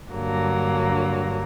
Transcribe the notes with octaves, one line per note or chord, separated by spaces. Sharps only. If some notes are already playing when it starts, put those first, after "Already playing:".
G2 D3 F#3 A#3